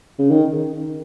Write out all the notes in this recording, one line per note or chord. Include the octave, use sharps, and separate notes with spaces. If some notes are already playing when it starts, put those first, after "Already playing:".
C#3
D#3